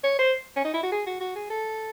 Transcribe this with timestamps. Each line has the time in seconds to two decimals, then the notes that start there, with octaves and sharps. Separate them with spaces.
0.04 C#5
0.19 C5
0.56 C#4
0.64 D#4
0.74 E4
0.83 F#4
0.92 G#4
1.06 F#4
1.20 F#4
1.36 G#4
1.50 A4